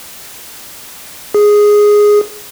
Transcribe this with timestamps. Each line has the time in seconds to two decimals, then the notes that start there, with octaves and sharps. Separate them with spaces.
1.35 G#4